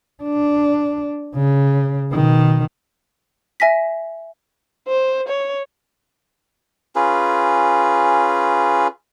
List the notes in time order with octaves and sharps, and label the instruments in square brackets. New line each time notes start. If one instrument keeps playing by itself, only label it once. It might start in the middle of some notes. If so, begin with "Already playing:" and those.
[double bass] D4
C#3
B2 D#3
[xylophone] E5 G#5 A#6 B6
[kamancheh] C5
C#5
[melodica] C#4 F4 G#4 B4